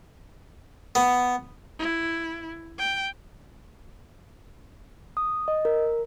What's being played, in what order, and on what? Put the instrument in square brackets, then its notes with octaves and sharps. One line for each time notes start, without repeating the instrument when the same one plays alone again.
[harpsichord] B3
[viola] E4
G5
[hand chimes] D#6
D#5
A#4